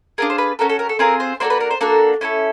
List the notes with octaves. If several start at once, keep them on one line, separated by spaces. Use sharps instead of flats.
D4 F4 G#4 A#4
C5
B4
C#4 F#4 A4 A#4
A4
A#4
A4
C4 F4 G#4 A#4
C5
A#3 D4 F#4 A4 C5
B4
A#4
C5
A#3 D4 F#4 A4
C#4 E4 A4 A#4